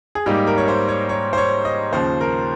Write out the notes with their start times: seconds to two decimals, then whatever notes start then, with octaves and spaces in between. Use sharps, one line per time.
0.15 G#4
0.26 G#2 G3 A#3 D#4 G4
0.47 A#4
0.58 C#5
0.68 C5
0.89 C#5
1.09 C#5
1.33 C5
1.37 C#5
1.65 D#5
1.92 D#2 C#3 F3 C5
2.21 A#4